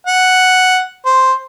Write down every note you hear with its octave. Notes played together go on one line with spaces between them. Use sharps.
F#5
C5